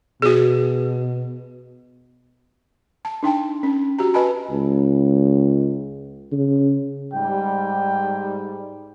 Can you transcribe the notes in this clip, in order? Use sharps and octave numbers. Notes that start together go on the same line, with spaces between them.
B2 F#4 G#4
A5
D4 D#4 G5 A5
C#4
F#4 G4 A#5
B4 D#5 G#5 A5 B5
C#2
C#3
G#2 G3 G5